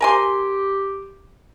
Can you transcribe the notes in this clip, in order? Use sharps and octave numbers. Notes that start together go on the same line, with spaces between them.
G4 A#4 G#5 C6